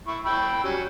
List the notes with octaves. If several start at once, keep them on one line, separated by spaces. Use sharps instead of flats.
E4 C#6
G5 B5 E6
F#3 G3 C#4